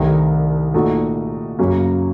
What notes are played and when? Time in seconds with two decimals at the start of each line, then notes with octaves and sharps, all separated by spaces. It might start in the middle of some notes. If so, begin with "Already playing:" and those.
Already playing: C2 C3 D#3 A3
0.74 A#2 A3 D#4 F#4
1.59 F#2 C#3 F#3 A#3 C#4